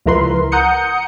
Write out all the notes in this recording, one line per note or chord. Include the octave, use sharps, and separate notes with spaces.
C#2 F3 E4 A#4 B4 C6
F#5 A#5 D#6 G6 C#7